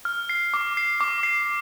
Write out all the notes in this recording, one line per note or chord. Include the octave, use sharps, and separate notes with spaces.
F6
C7
D6
C7
D6
C7